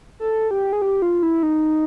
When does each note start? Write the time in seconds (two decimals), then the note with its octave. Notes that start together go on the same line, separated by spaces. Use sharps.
0.20 A4
0.51 G4
0.73 G#4
0.82 G4
1.02 F4
1.23 E4
1.43 D#4